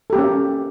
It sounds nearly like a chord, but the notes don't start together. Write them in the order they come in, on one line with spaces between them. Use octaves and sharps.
A4 G4 A#3 C#4